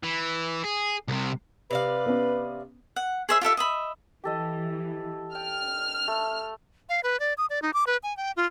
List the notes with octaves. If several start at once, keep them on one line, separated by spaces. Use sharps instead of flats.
E3
G#4
C2 C3
C3 B4 D5 F5
B3 C#4
F#5
G#4 C5 E5
F4 G4 A4 E5
D#5 E5 B5
E3 G4 A4 D#5
G5 F6
A3
F5
B4
D5
D#6
D5
D#4
D6
B4
G#5
G5
F4